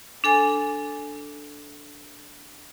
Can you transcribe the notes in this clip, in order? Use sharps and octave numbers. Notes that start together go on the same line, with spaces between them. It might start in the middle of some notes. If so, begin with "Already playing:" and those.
D4 A4 G#5